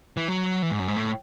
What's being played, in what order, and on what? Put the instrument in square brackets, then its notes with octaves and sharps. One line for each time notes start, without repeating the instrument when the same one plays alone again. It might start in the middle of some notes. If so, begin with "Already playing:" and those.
[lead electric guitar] E3
F#3
E3
G#2
F#2
G#2
A2